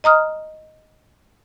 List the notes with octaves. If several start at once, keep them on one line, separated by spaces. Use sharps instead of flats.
D#5 A#5 D#6 F6